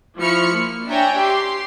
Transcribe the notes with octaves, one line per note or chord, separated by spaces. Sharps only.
F3 E4 B5 C#6 F6 C#7
A#3
D4 C#5 E5 G5 G#5 A#5
G4 C6 C7